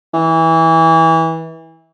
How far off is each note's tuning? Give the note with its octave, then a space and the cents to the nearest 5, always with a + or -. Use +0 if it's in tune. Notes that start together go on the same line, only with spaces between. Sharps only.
E3 -20